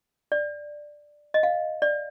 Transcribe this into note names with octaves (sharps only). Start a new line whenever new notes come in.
D5
D#5
F5
D5